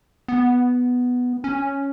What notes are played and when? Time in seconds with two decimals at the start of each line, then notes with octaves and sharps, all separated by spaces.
0.28 B3
1.44 C#4